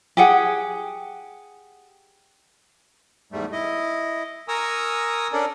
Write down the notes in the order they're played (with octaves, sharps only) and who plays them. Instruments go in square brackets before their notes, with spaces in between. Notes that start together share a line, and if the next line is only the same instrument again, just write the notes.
[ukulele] G4 G#4 F#5
[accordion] E2 G#2 G3 A3
E4 D#5
A#4 G#5 A#5 C#6 D#6 E6
C#4 D4 A4 A#4 D5